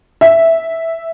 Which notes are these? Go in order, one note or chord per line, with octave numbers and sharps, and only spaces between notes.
E5